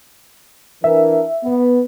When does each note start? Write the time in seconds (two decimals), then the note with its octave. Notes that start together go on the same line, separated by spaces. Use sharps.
0.84 E3 D4 A#4 E5
1.43 B3